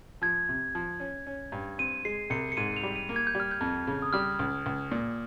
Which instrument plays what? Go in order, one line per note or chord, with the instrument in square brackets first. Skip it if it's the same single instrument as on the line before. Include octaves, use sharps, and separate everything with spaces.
[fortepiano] F3 [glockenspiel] G#6
[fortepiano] C3
F3
C#4
C#4
G2
[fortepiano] C4 [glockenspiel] D#7
[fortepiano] G#3 [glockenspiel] C7
[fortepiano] C2 [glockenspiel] C#7
[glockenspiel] C#7
[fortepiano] G#2 [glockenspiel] D#7
[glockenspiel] F7
[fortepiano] G3
[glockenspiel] D#7
[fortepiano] A#3
[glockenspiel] G#6
G6
[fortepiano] G3
[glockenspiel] F6
G6
[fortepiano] F2
C#3
[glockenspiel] D#6
[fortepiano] G3 [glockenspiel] F6
[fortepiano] C#2
C#2
A#2